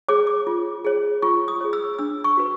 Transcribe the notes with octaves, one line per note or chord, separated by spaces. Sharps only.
G#4 C#5 D6
D6
F4
G#4 C#5
F4 C#6
D#6
G#4 C#5
E6
D4 E6
C#6
F#4 B4